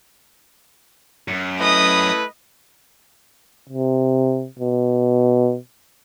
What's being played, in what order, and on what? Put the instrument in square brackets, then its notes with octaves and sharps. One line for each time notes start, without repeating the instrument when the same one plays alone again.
[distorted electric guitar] F#2
[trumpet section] A3 E4 B4 [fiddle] D#5 D#6
[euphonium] C3
B2